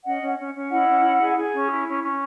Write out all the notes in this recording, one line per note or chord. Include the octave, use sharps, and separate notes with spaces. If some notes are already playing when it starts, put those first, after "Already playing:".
C#4 D#5 F#5
C#4
C#4
C#4
E4 D#5 F#5
C#4
E4
G#4
G#4
C#4
E4
C#4
C#4